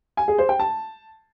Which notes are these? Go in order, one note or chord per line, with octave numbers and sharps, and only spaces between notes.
G#5
G#4
C5
G5
A5